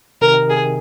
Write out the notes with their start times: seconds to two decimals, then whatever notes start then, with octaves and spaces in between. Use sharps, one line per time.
0.21 C3 D#3 A#4
0.50 G#4